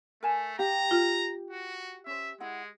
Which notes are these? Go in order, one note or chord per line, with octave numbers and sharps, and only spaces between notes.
A3 A#4 G#5 A5
G4 F5 A#5
F4 F6
F#4
C#4 C5 E5
G#3 E4 F#5